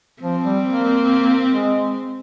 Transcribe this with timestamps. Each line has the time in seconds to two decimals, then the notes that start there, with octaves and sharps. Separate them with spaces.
0.22 F3 C4
0.44 G3
0.65 A#3
1.51 G#3